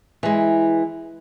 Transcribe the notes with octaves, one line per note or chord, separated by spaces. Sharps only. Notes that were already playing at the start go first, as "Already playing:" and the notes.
E3 G#3